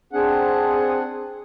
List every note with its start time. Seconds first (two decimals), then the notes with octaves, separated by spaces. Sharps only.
0.13 C4 D4 G#4 F#5